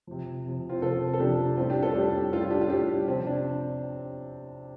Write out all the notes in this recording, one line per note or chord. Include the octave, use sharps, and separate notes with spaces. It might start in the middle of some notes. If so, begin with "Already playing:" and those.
C3 F3
C3 F3
C4 F4
C3 F3 F4 A4
A4
C3 F3 D4 G4
A2 G3 C4 F4
D4 G4
F4 A4
A2 G3 D4 G4
A2 G3 F4 A4
F4
D4 G4
F4
A2 G3 D4 G4
C3 F3 C4
D4